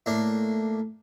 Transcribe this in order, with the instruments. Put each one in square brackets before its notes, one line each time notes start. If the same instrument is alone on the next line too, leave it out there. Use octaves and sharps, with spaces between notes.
[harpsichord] A2 A#3 D4